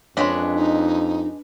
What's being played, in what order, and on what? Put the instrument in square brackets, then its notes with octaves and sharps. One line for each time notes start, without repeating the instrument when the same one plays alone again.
[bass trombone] F2 [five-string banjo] G#3 C#4 D#5 [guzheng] D4 B4
[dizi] D#4